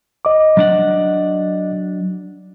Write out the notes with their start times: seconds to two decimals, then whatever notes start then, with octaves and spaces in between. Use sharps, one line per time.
0.25 D#5 D6
0.57 F#3 D4 F#5